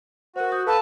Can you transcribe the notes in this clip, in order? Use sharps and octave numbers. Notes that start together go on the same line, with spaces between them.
F#4 A#4 C5
D#6 G6
A4 B4 F5 A5